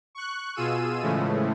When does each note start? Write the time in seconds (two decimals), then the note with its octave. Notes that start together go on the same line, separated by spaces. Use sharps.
0.15 C#6 F#6
0.55 B2 F4 G#4 E6 D#7
1.02 A2 C#3 E3 F3 G#3 A3